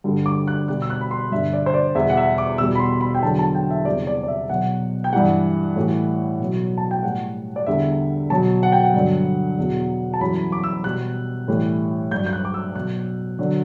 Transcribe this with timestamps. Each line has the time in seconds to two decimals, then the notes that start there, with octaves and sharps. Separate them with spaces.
0.04 G2 D3 G3
0.26 D6
0.48 F#6
0.68 B2 G3 F#6
0.82 E6
0.90 F#6
1.01 B5
1.11 C6
1.31 G2 D3 G3 E5
1.53 D5
1.66 C5
1.74 D5
1.95 E2 B2 G3 E5
2.09 F#5
2.17 E5
2.38 D6
2.58 E2 B2 G3 E6
2.75 B5
2.79 C6
3.01 B5
3.14 G5
3.22 E2 D3 F#3 A5
3.39 A5
3.55 G5
3.71 E5
3.85 E2 C3 G3 D5
4.07 D5
4.23 D5
4.28 E5
4.49 B2 F#3 F#5
5.04 G5
5.13 G2 E3 G3 F#5
5.76 A2 E3 G3
6.40 B2 F#3
6.78 A5
6.91 G5
7.03 A2 G3 F#5
7.56 D5
7.66 E2 D3 G3 E5
8.30 B2 F#3 A5
8.63 F#5
8.72 G5
8.84 F#5
8.94 G2 D3 F#3
9.58 E2 B2 F#3
10.14 A5
10.21 F#2 E3 G3 B5
10.52 D6
10.64 E6
10.84 B2 G3 F#6
11.48 A2 E3 G3
12.11 G2 F#3 G6
12.26 G6
12.33 F#6
12.45 D6
12.54 E6
12.75 B2 F#3 F#6
13.39 D3 F#3